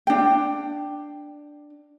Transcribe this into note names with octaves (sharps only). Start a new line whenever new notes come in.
D4 G5